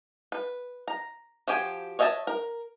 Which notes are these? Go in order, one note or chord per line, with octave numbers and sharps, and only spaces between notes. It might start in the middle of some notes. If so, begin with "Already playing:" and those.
B4
A#5
F3 F#4 G4 G#5
C#5 D#5 E5 G5 A5
A#4